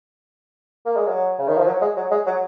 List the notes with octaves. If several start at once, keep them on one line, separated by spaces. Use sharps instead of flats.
A#3
G#3
F#3
C#3
D#3
F3
F#3
G#3
F#3
G#3
F#3